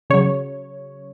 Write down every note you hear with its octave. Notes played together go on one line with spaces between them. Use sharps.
C#3 F#3 C#5